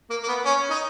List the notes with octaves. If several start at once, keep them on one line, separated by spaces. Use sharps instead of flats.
A#3
A#3
B3
C#4
D#4